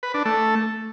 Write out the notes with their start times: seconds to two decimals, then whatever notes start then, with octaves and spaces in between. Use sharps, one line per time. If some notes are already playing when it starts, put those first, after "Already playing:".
0.03 B4
0.14 D4
0.25 A3